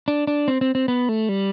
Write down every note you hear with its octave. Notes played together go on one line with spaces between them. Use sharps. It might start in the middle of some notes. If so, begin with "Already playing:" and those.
D4
D4
C4
C4
C4
B3
A3
G3